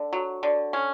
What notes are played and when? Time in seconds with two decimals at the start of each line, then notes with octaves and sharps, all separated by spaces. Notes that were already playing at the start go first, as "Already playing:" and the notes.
Already playing: D3
0.13 F#3
0.43 D3
0.73 C#4